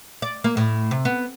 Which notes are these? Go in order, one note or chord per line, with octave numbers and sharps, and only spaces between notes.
D5
A#3
A2
C3
B3